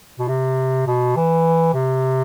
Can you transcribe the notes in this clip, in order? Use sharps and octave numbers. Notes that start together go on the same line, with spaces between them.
B2
C3
B2
E3
C3